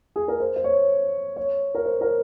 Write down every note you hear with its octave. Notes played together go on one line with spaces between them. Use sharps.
G#4
A#4
C5
C5
C#5
C#5
A#4
C5
A#4